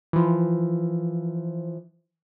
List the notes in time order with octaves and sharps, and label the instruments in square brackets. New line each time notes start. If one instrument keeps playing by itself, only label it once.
[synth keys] E3 F3